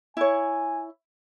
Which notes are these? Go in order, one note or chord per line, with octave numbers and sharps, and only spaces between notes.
E4 C#5 G#5